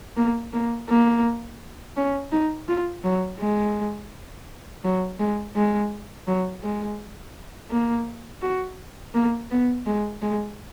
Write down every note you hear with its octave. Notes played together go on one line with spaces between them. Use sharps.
A#3
A#3
A#3
C#4
D#4
F4
F#3
G#3
F#3
G#3
G#3
F#3
G#3
A#3
F#4
A#3
B3
G#3
G#3